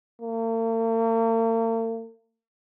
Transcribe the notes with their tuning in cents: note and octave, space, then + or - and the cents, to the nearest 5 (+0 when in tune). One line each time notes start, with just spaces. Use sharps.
A#3 -45